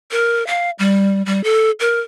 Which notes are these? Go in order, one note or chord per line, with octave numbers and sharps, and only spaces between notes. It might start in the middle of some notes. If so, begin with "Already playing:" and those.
A#4
F5
G3
G3
A4
A#4